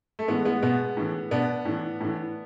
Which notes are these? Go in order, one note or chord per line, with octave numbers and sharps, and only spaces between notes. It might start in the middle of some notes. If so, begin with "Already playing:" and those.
A3
A2 E3 G#3 B3
G#3 B3
B2 G#3 B3
A2 E3
B2 B3 D4
A2 E3
A2 E3